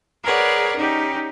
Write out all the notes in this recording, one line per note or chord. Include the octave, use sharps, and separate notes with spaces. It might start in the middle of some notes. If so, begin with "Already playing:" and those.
G#4 A#4 B4 C#5 D5 F#5
C#4 D#4 G4